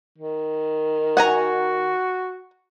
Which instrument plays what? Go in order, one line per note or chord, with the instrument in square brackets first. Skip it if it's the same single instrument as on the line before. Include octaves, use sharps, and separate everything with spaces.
[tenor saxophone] D#3
[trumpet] F#4 [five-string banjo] F#5 G#5 A#5